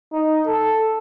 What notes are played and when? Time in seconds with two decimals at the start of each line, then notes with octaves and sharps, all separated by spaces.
0.13 D#4
0.47 A4